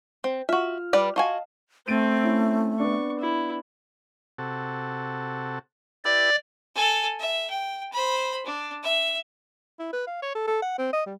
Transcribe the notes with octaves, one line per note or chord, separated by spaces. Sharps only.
C4
F4 F#4 E5 F6
G3 B4 D5
F4 F#4 D#5 F5 G#5 A5
A3 C4 A6 D7 D#7
C#4 E4
B3 D4 C#6
E4
C3 F#4 A4
E4 G4 B4 D5
A4 G#5
E5
G5
C5 B5
D4
E5
E4
B4
F5
C#5
A4
A4
F#5
C4
D#5
G3